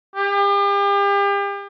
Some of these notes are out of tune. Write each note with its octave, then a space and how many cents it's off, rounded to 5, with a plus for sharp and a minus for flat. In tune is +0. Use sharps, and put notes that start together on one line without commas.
G4 +40